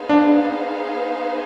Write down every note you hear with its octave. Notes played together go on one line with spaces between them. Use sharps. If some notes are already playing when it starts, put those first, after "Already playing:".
Already playing: B3 D#4 G#4 C5 F5
D4